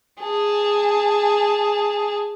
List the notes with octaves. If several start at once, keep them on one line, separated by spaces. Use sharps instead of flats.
G#4 A5